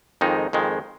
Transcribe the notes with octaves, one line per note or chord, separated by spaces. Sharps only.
F2 D#3 G#3 D#4
F2 D#3 G#3